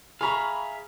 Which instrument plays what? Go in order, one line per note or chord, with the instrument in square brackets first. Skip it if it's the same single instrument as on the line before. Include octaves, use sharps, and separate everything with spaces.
[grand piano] G#4 A#5 [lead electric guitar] E5 F5 [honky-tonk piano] B5 C#6